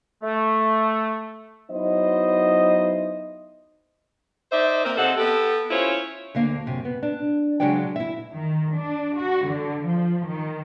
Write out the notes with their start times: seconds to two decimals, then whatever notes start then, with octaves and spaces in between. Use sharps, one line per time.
0.23 A3
1.71 F#3 B3 D#4 E4 C5 D#5
4.52 D#4 C5 D5 E5
4.85 A#3 C4 A#4
4.97 C3 A4 C5 D#5 F#5
5.17 B3 G4 A4
5.71 C#4 E4 F4 C5 C#5
6.35 D2 D3 A#3 F5
6.66 F#2 C3
6.85 B3
7.03 D4
7.60 C#3 F#3 G#3 D4 D5 G5
7.96 E4 E5
8.33 D#3
8.74 D4
9.17 F#4
9.46 D3
9.84 F3
10.26 D#3